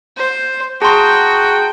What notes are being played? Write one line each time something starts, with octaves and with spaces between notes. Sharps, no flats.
C5
F#4 G#4 G5 A5 A#5 C6 C#6